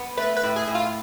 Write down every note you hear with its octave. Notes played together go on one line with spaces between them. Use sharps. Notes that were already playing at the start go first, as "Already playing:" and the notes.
Already playing: B3
A3 B4
B4
A2
G#4
A2
F4